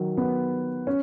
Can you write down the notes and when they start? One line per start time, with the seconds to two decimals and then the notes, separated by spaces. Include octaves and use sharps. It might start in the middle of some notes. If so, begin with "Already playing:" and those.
Already playing: D#3 F#3
0.17 B3
0.87 C#4